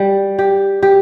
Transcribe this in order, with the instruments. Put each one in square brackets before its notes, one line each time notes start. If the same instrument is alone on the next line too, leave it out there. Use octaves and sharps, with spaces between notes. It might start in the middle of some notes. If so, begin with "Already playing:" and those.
Already playing: [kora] G3
G4
G4